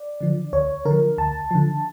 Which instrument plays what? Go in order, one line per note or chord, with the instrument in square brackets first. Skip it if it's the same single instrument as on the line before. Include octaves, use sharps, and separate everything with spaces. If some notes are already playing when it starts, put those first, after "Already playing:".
Already playing: [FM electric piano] D5
D3 F3
D2 C#5
D3 A#4
F3
D2 A5
D3 F3